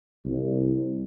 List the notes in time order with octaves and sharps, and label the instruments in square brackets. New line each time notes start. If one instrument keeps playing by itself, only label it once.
[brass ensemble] C2